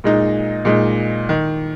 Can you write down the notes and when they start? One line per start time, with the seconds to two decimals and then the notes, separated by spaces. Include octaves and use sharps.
0.04 A#2 G#3 D#4
0.65 A#2 G#3 D#4
1.29 D#3